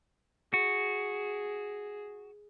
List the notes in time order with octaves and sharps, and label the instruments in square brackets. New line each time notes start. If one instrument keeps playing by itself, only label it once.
[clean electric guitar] F#4 [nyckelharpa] G#4